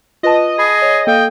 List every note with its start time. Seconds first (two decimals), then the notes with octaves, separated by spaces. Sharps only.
0.23 F4 B4 D#5 A5
0.59 G#4 B5
0.82 C#5
1.07 A#3 A4 F5 G5